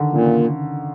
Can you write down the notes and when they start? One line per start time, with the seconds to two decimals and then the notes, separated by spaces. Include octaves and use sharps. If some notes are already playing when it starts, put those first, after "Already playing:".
Already playing: D3 D#3
0.12 A#2 C#3